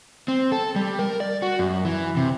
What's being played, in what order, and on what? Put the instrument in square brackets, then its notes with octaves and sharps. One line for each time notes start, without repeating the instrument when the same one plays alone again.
[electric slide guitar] C4
A4
G3
A#4
D5
F#4
F#2
E3
C3